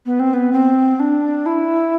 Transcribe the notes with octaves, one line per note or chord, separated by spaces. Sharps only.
B3
C4
B3
C4
D4
E4